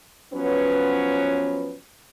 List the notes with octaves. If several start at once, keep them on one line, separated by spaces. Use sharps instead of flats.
F3 F#3 B3 C#4 B4